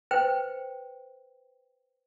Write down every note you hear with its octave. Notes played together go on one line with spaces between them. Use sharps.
B4 C5 G5